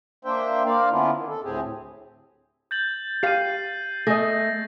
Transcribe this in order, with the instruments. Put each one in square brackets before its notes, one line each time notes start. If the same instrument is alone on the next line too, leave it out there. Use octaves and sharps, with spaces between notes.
[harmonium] A#3 D4 C5 E5 G5
A#3 A#4 C5 D5 F5
D3 B3 C#4 D4 E4 F4
D#3
A4
D2 A2 C4 G4 G#4
[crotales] G6 A6 F#7
[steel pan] G4 F5 [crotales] C7 D#7
[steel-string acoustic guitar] A3 [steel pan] G#4 D#5 [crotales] A#6